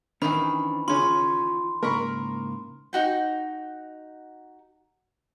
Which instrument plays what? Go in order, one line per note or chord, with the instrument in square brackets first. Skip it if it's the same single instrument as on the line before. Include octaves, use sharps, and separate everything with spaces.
[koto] D#3 E3 [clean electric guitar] C#4 D4 C5 [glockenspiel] B5
[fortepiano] C#3 C#4 [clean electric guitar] F4 [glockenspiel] C6
[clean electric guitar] G#2 C#3 A#3 [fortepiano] A#4 B5 C#6
[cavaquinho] D#4 F#4 G5